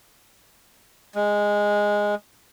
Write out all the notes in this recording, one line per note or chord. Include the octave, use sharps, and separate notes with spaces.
G#3